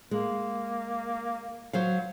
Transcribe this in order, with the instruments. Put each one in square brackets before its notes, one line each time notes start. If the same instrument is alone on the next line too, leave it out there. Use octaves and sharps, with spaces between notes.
[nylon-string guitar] G#3 [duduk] A#3
[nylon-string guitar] F#3 C5 F5